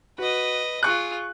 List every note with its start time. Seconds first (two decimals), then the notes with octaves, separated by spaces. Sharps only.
0.18 F#4 B4 D#5
0.83 F4 G#4 C#6 F#6